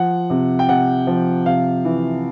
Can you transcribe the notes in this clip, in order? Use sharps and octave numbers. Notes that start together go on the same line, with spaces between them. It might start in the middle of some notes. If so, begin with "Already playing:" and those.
Already playing: F3 F#5
C3
G5
C3 F#5
F3
C3 F5
E3